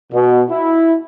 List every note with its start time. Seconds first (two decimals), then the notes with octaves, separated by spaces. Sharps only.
0.13 B2
0.49 E4